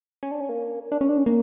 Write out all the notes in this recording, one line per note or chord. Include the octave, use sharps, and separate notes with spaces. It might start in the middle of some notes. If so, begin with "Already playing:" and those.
C#4
D4
C#4
A#3
D4
C#4
D4
C#4
A#3